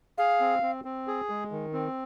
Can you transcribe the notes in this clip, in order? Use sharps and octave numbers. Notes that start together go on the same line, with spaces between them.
G#4 F5
C4
C4
C4
G#4
G#3
D#3
C4